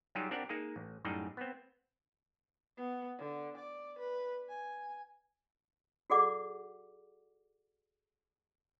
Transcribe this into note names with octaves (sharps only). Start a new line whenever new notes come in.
F#3 G3 D#4 F4 G4 G#4
C4 D4 G4 A#4 D5 F#5
G#3 A#3 D#4 G#4
A1
F#2 A2 G3 D#4 G#4 D#5
B3 C4
B3
D3
D5
B4
G#5
F#4 G#4 A4 D5 F#5 D6